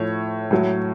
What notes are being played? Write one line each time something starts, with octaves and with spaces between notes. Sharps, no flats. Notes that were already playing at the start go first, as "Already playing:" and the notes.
Already playing: A2 F3 C#5
A2 F#3